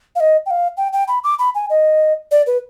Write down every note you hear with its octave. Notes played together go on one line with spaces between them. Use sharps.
F5
D#5
G5
F5
G5
G5
B5
D6
B5
G#5
D#5
D5
B4